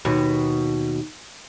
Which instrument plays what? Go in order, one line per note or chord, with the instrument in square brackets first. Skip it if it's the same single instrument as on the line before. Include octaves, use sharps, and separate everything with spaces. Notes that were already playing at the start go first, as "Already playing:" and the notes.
[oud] D#2 B2